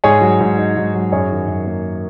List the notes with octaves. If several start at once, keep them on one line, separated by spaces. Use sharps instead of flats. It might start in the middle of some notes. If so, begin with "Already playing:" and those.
G#2 G#4 C#5
F#3
G#2
D#4
G#2
F#3
F#2 G#4 C#5
D#3
F#2
A#3